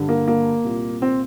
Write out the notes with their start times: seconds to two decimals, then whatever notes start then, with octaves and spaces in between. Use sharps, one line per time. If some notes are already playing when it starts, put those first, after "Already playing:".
Already playing: G2 D3
0.09 A#3
0.28 A#3
0.64 C2 A#2
1.02 C4